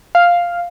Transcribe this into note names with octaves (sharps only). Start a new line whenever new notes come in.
F5